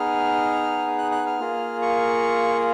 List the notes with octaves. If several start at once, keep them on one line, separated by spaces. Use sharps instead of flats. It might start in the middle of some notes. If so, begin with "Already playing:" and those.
Already playing: B3 D#4 G#4 F6
F#6
F#6
F6
A#3 F4 G#4
C#6